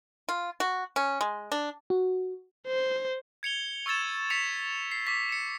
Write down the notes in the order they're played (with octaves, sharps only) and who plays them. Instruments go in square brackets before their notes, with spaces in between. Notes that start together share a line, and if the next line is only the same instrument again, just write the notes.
[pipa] F4
F#4
C#4
G#3
D4
[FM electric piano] F#4
[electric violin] C5
[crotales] G#6 C#7 F7 G7
C#6 E6 G#6 A6 E7
C#6 B6 C#7 F7
C7
D6 B6
C#7 E7